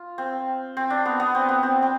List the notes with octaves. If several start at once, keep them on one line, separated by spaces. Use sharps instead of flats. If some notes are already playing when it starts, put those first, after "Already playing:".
Already playing: F4
C4
C4
D4
B3
B3
C4
B3
C4
C4